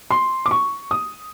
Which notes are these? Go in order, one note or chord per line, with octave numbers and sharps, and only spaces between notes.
C6
D6
C#6
D#6